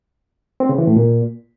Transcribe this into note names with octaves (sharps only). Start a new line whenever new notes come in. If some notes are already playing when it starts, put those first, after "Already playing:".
C4
C#3
E3
A2
A#2